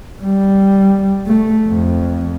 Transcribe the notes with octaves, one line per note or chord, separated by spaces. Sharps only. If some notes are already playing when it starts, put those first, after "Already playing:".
G3
A3
F2